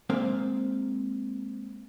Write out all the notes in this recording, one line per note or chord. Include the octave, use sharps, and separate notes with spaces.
G#3 A#3 C4 D5 E5 F5